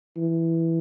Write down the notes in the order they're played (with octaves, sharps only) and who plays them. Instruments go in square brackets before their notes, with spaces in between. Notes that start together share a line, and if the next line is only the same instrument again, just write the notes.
[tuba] E3